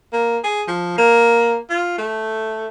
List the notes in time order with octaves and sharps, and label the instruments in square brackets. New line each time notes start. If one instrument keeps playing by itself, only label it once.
[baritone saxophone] A#3
G#4
F3
A#3
F4
A3